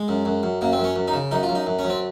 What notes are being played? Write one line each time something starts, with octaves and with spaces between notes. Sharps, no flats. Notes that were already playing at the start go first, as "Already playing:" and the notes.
Already playing: G#3
F#2
F#2
F#2
F#2 A#3
C4
F#2
C#4
F#2
D#4
C#3
F#2 D#4
F4
F#2
D#4
F#2
C#4
F#2
C4